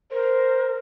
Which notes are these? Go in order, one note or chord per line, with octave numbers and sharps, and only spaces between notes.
A#4 C5